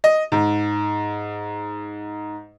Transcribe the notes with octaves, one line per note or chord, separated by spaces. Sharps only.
D#5
G#2